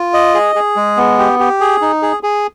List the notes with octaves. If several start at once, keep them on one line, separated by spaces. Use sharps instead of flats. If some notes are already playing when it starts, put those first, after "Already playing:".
Already playing: F4
D#5
G#4
G#4
G#3
B3
G4
G4
G#4
D#4
G#4
G#4